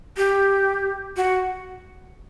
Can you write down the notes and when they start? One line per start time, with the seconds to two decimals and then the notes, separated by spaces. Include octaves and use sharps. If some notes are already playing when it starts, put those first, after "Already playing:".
0.17 G4
1.17 F#4